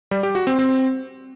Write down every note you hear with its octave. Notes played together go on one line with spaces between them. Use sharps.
G3
G4
F#4
C4
C4